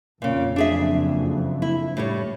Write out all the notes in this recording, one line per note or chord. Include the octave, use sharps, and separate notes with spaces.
F#1 F2 A#2 C#3
D4 G#4 E5
E4
A2 G3 C#5